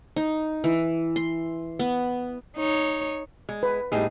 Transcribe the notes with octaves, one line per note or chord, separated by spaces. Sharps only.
D#4
E3
C6
B3
D#4 C#5
G#3
B4
A2 G3 D#4 G#4